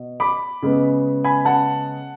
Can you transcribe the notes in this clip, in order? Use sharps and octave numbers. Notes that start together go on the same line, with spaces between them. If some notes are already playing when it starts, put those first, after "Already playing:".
Already playing: B2
B5 D6
C#3 G#3 B3
G#5 B5
F#5 A5